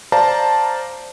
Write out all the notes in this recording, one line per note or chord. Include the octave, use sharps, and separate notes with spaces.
C5 D5 F5 A5 A#5